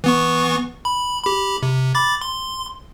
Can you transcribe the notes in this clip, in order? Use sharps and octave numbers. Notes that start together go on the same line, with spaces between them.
E3 B3 C#6
B5
G4 B5
C3
B5 D6 A6
C6